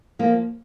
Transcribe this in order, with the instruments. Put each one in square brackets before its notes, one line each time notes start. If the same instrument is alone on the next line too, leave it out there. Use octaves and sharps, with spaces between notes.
[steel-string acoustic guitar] F3 A#3